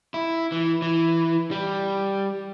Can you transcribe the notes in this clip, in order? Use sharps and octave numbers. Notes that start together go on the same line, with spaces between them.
E4
E3
E3
G3